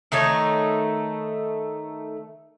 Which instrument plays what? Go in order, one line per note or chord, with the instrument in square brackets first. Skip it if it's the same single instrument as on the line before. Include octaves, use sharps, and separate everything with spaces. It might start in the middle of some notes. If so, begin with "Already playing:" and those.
[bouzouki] D#3 A3 D#4 C#5